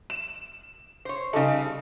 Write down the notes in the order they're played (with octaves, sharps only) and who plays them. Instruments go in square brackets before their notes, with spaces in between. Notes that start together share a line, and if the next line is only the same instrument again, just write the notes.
[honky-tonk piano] E7
[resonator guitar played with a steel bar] C5 C#5
[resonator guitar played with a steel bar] C#3 G3 A4 [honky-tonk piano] D#4